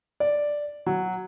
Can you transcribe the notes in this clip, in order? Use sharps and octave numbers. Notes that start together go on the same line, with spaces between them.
D5
F#3